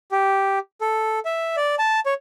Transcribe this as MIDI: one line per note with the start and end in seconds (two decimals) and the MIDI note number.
0.11 0.59 67
0.81 1.19 69
1.25 1.56 76
1.57 1.75 74
1.79 2.00 81
2.06 2.14 73